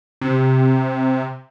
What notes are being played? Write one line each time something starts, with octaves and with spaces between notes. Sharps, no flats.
C3